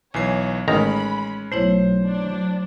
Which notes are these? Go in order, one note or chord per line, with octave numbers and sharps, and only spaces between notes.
B1 E3 C#5 G#5 C7
A1 D#3 G#3 C#4 A#5 B5
B1 A3 E4 C5 C#5
F#3 D4